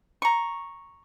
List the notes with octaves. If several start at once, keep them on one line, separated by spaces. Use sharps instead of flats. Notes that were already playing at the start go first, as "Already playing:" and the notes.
A#5 C#6